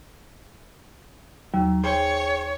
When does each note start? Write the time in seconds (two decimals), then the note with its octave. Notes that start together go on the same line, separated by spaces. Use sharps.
1.54 D#2 F#3
1.84 G#4 C5 C#5 G5